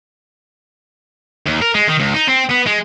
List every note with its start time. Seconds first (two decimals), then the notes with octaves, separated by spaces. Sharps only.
1.46 D#2
1.62 A#4
1.75 G#3
1.88 D#3
2.00 C#2
2.15 D#4
2.29 C4
2.51 B3
2.67 G#3